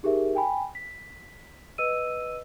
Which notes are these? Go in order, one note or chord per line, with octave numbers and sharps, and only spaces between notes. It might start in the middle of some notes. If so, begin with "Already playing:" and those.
D#4 G4 G#4 A#4 E5
G5 G#5 B5
B6
B4 D#5 E6 D#7